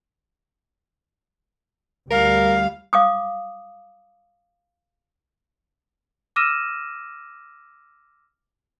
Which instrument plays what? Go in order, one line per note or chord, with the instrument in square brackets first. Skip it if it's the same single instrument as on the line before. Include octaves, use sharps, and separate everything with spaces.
[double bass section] D2 G3 [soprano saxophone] A#4 [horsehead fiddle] F5
[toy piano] F5 D6 D#6
[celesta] D6 E6 F6 A#6 D#7 E7